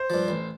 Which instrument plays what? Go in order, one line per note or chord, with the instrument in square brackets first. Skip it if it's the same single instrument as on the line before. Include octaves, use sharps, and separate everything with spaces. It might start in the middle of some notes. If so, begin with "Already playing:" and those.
Already playing: [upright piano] C5
[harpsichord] G2 F3
A1